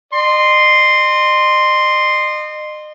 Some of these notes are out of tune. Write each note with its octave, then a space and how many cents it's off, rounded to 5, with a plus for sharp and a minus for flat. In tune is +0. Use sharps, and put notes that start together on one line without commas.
D#5 -35 C6 +0